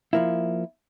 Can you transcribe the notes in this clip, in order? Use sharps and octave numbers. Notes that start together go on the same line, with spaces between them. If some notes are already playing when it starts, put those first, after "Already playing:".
F3 A#3 E4